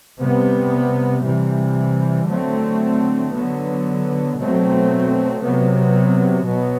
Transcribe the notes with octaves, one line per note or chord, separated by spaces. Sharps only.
C3 G3 B3
C3 E3 G3
D3 F#3 A3 C4
D3 F#3 B3
B2 F#3 A3 C4
C3 F#3 B3
B2 F#3 B3